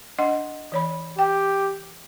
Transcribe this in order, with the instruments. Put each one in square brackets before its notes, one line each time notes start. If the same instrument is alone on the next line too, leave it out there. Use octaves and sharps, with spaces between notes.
[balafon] D4 D#5 F#5
E3 C#5 B5
[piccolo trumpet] G4 [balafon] G5